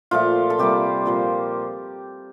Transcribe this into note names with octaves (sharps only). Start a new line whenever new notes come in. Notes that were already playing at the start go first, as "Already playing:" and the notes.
A#2 F3 A3 F4
A4
C3 G3 A#3 G4
A#2 F3 A#3